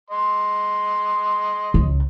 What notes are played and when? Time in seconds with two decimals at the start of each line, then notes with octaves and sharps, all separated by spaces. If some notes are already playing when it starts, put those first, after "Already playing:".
0.10 D#5 C6
1.74 C#2